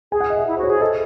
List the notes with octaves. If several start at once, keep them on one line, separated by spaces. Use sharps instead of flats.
G#4 G#5
F#5
D#5
E5
E4
F#4 C5
C#5
G#4
A4 D#5